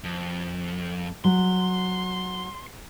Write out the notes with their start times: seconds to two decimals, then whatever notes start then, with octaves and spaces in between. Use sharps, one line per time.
0.04 F2
1.24 F#3 C6